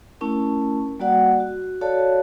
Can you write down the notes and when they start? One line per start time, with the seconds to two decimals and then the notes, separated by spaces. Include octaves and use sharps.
0.21 A3 C#4 E4 A#4 A5
1.00 G3 A#3 F#4 D5 F#5
1.40 F#4
1.81 F#4 A4 C#5 D5 F5 A5